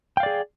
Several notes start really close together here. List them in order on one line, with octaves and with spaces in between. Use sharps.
G5 F5 D5 G#4